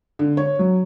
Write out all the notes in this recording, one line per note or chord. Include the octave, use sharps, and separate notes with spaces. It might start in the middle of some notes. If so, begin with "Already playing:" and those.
D3
C#5
F#3